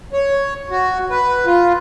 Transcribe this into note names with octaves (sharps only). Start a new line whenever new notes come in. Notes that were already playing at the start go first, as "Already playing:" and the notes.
C#5
F#4
B4
F4